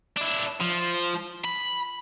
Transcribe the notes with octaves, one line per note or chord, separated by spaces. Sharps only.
D4 E4
F3
B5